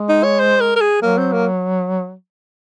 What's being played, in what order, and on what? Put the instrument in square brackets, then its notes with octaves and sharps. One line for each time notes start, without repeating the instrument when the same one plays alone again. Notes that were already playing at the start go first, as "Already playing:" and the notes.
Already playing: [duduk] G#3
[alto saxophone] D#4
C#5
C5
A#4
A#4
G#4
[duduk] F#3 [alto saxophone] A#3
[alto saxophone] C4
A#3